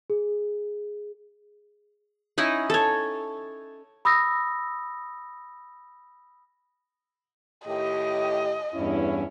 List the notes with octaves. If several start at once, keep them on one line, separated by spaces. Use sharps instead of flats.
G#4
C#4 D#4 E4 D#5
A4 C#5
B5 D#6 E6 A#6
A2 D#3 G4 D#5
E2 G2 C#4 E4